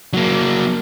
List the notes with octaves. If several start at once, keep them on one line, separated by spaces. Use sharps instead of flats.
F#3 A#3